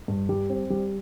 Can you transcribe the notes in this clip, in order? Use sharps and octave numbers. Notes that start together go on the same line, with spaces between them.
G2
G3
C4
G3